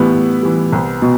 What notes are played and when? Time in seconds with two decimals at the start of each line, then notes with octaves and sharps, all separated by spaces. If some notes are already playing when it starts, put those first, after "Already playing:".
Already playing: A2 E3 G3 B3 E4 B4
0.13 A2
0.42 E3 G3
0.72 C2
1.02 B2